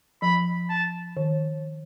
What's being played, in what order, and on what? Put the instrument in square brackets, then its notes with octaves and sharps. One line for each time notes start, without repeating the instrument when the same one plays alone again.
[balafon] F3 [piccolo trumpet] B5
[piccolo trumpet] A5
[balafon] D#3